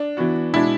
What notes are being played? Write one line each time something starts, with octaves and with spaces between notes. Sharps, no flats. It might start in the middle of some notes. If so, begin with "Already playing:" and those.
Already playing: D4
E3 B3 F#4
B2 G#3 D4 E4